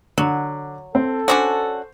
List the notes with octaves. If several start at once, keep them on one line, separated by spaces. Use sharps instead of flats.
D3 F#3
C4 A4
C#4 D4 F#4 C5